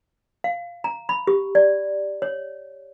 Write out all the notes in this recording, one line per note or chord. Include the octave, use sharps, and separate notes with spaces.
F5
A#5
B5
G4
D5
C#5